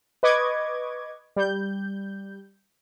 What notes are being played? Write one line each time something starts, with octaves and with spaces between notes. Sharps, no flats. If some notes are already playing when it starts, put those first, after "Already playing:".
B4 D#5 C#6 D6 G#6
G3 G6